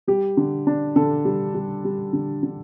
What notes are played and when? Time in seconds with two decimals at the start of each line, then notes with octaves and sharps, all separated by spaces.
0.08 G3 G4
0.37 D3
0.67 D4
0.96 D3 A4
1.25 G3
1.54 G3
1.85 G3
2.13 D3
2.43 D3